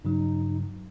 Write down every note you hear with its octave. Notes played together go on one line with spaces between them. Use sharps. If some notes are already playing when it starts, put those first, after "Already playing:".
G2 C#3 F#3 D#4